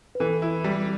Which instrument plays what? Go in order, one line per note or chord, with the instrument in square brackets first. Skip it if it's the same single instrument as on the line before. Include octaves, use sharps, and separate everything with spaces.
[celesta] B4
[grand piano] E3 [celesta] A4
[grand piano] E4
G3